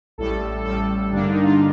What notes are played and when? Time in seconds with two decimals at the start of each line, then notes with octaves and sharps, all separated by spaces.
0.18 A1 A2 G3 A4
0.64 A1 A2 G3 A4
1.12 G2 D3 G3 A#3 D4
1.28 D#4
1.43 F4